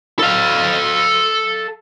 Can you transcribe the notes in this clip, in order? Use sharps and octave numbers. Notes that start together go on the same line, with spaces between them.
A4 F5